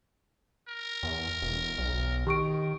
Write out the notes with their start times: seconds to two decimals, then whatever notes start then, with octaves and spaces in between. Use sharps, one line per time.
0.68 A#4
1.03 E2
1.42 E1
1.78 B1
2.27 D#3 G4 C#6 D7